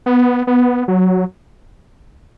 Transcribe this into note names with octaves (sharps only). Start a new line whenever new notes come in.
B3
B3
F#3